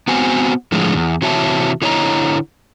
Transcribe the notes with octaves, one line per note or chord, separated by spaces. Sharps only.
B3 C4 F#4 C5 G#5
A2 D3 F3 G#3
E2
C3 E3 F#4 C#5 E5 A5
D3 E4 C#5 D#5 A#5